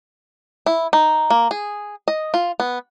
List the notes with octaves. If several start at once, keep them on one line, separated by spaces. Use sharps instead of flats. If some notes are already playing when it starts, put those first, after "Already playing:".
E4
D#4
A#3
G#4
D#5
F4
B3